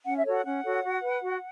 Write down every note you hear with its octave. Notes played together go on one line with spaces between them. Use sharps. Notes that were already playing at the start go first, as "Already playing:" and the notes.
C#4 F#5
E5
F#4 A4 C#5
F#5
C#4 F#5
F#4 A4 C#5
F#4
B4
F#4